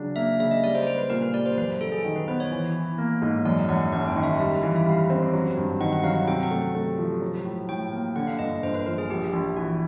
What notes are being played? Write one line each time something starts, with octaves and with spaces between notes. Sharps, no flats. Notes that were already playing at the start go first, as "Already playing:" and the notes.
Already playing: C#3 F#3 D4
A#3 E5
C#3 E5
D#5
G3 D5
C5
G3 C5
B4
A#2 A#4
B4
G3 D5
C5
F#2 B4
F#3 A4
G#4
D#3
B4
B3 C5
C#5
E3
E3
A#3
G#2
F#2 D5
F#2 F#5
F#1 F#5
G5
D#3
E5
G3 E5
E3 F5
E5
G3 F5
C4
F#3
G2
D#3 F#5
F#5
F#3 F5
F#5
C3 G5
F#5
A3
A3
F3
F#3
A2
A2 G5
A#3
D3 F#5
F5
G1 D#5
G1 C5
B4
F3 A#4
G#4
A#1 G4
A#1
E3 F#4